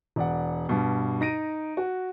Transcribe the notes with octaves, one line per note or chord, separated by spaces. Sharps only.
E1 D5 F#5
G2 B2
D#4 A#6 D7 D#7
F#4